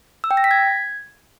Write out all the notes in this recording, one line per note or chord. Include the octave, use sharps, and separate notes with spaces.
E6
G5
A#6
B6
G#6